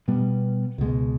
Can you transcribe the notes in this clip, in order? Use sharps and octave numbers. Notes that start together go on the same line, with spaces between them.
B2 G3 B3
C#2 B2 G#3